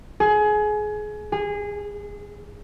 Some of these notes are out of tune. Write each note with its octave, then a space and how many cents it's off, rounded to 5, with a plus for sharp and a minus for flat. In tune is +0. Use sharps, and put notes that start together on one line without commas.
G#4 +25
G#4 -20